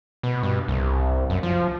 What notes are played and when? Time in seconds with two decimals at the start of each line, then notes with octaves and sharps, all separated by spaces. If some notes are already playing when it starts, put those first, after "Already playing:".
0.23 B2
0.43 G2
0.68 C2
1.30 F#2
1.43 F3